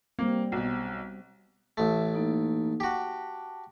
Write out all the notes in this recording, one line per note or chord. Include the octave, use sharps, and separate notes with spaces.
G3 A#3 C4
B1 B2
A1 A3 E5
A#3 D#4 A4
F#4 G4 A5